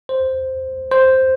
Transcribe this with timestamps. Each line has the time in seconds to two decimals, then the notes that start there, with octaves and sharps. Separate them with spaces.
0.09 C5
0.92 C5